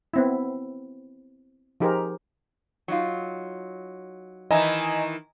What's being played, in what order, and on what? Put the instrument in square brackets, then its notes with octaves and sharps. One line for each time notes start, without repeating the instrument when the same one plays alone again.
[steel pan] B3 C4 E4
F3 D#4 G4 G#4 A#4 C5
[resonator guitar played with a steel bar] F#3 D#4 F4
[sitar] D#3 E3 E4 [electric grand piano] D#5 G#5 A#5